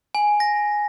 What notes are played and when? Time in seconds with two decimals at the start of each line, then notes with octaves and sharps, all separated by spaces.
0.15 G#5
0.40 A#6